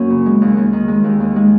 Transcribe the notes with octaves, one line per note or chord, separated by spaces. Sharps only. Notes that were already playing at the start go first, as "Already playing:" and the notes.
Already playing: F#2 A#3 C#4
C#3
G#3
D#2
D#2
D#3
G#3
D#2
D#2
G#3